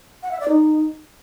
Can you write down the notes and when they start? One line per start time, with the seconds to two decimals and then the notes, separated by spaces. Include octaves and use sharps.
0.23 F#5
0.31 E5
0.40 D5
0.48 D#4